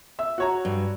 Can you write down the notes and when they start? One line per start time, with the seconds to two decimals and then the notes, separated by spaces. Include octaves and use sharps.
0.19 E5 E6
0.38 F#4 C#5 A#5
0.65 G2